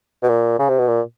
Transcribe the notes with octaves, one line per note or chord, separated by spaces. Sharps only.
B2
A#2
C#3
C3
B2
A#2